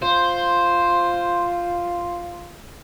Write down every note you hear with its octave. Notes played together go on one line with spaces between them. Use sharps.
F4 C5